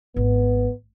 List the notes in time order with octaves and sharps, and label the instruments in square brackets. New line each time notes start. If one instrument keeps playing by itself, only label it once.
[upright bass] G#1 [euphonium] B3